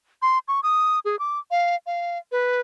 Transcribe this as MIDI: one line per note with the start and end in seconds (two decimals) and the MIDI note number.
0.22 0.39 84
0.48 0.60 85
0.63 0.99 87
1.05 1.18 68
1.19 1.39 86
1.51 1.76 77
1.86 2.18 77
2.32 2.60 71